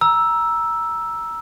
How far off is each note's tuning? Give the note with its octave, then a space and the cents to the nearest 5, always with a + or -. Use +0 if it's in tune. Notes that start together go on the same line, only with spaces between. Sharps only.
A#5 +15 E6 +0